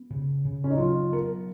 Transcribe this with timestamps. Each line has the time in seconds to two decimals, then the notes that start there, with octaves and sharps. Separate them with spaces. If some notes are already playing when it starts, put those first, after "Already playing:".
Already playing: B3
0.10 C#3
0.45 C#3
0.64 C#4
0.71 D#4
0.78 F#3 F4
1.12 B3 A#4